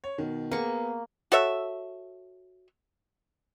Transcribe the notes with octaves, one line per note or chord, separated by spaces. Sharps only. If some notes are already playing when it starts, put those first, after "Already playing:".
C#5
B2 D#3
A#3 B3 G#4 C#6
F#4 A4 C#5 E5